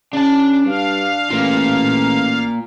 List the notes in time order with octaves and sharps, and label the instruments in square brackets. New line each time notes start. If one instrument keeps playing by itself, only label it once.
[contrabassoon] C#3 [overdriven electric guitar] D4 A5
[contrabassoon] G2 [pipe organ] F5
[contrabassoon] A1 [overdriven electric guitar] A#3 F4